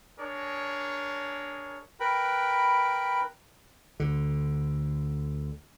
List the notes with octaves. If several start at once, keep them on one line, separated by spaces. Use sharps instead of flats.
D4 G#4 A#4 C#5
A#4 B4 G5 B5
D2 D3